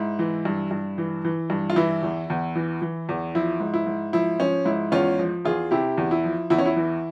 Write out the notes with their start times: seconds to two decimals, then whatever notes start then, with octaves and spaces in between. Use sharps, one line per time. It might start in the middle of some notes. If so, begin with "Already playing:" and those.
Already playing: G#2 E4
0.19 E3
0.45 G2
0.71 G2
0.98 E3
1.25 E3
1.50 G2
1.70 F4
1.76 E3 E4
2.03 E2
2.30 E2
2.55 E3
2.82 E3
3.09 E2
3.35 F3 E4
3.60 G#2
3.74 E4
3.86 G#2
4.13 F3 E4
4.40 F3 C#4
4.65 G#2 E4
4.92 E2 C#4 F4
5.19 F3
5.45 E2 F4 G#4
5.71 C3 E4 G4
5.98 E2
6.11 E4
6.24 F3
6.50 E2 E4
6.58 C#4
6.66 E4
6.76 E3